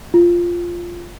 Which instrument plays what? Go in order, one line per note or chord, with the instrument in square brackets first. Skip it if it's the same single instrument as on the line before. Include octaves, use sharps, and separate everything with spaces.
[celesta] F4